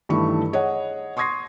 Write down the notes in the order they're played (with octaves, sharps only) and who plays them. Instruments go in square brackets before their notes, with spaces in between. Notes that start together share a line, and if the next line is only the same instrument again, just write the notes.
[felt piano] G2 D#3 E3 A3 C#6
G#4 C#5 D#5 F#5
C6 C#6 D#6 G#6 A#6 C7